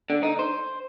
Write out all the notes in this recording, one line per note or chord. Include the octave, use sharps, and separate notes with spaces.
D3
D#4
C5